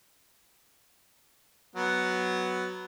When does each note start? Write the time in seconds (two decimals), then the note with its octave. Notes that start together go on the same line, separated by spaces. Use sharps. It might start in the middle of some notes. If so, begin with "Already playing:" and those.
1.76 F#3 B3